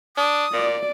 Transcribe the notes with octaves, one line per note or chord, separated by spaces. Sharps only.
D4 D#6
A#2 D5